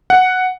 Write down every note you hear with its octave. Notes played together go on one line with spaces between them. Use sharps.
F#5